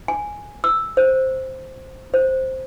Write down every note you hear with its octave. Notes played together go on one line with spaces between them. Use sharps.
G#5
E6
C5
C5